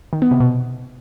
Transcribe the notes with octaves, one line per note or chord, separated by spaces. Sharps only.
D#3
B3
C3
B2